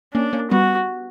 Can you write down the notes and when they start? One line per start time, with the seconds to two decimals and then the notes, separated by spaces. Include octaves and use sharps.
0.14 A#3 C#4 D4
0.33 A#3 C#4
0.51 G3 B3 F#4